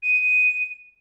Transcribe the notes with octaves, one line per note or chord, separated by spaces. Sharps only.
D#7